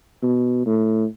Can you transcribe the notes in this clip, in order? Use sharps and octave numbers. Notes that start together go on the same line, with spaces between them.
B2
A2